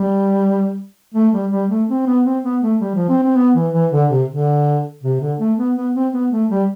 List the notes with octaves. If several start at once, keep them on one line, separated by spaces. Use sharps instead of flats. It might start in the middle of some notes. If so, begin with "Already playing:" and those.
Already playing: G3
A3
G3
G3
A3
C4
B3
C4
B3
A3
G3
F3
C4
C4
B3
E3
E3
D3
C3
D3
C3
D3
A3
B3
B3
C4
B3
A3
G3